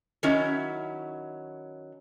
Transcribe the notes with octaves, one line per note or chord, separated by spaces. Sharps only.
D#3 F#3 C#4 E4